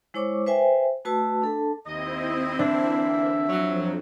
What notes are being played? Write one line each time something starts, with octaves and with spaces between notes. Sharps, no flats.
G#3 E4 C5 C#5 C#6 D6
B4 C5 E5 G5 G#5
A3 F#4 B4 A5 E6
D4 A4 A5
D#2 C4 E4 D#5
D3 E3 A#3 D4 E5
F2 F#3